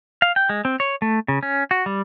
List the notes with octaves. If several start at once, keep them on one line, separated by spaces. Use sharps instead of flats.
F5
G5
G#3
C4
C#5
A3
C#3
C#4
F#4
G3